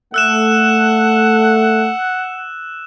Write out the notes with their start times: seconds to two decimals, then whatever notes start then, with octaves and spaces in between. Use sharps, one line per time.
0.14 A3 F#5 E6 F#6 E7